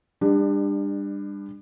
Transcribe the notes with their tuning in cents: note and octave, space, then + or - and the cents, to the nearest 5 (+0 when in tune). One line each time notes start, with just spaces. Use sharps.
G3 +35 D4 +20